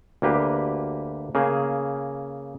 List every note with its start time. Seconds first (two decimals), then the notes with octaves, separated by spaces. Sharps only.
0.22 D2 A#3 G4 B4
1.35 C#3 A#3 G#4